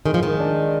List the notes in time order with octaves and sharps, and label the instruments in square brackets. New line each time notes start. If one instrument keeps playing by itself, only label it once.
[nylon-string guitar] D#3 [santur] G#3
[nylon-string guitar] F3
D#3
[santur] D4